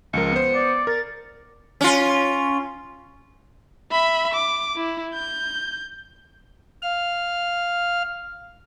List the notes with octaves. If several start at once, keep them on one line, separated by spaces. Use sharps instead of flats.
C#2 F3 A#4 C#7
B3 C5
D5
A#4 A6
C#4 F4
E5 B5
D6
E4
G6
F5 F6